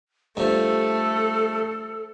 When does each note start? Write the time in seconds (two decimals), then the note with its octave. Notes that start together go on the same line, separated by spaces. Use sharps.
0.37 G2 F3 A3 A4